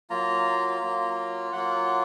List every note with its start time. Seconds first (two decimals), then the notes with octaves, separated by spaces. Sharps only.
0.10 F#3 A#3 F4 A#5
0.81 F#3 A#3 F4
1.52 F#3 A#3 F4 F#5